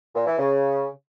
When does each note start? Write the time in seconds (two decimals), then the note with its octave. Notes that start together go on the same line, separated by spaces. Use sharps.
0.15 A#2
0.26 E3
0.38 C#3